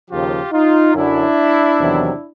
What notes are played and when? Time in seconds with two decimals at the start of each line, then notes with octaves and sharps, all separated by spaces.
0.10 D#2 C#3 F3 F4 G4
0.53 D#4 F4
0.95 F#2 D3 F#3 D4 E4
1.80 E2 C3 D#3 F#3